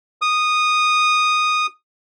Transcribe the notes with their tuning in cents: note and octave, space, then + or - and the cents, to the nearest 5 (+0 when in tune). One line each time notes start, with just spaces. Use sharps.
D#6 -10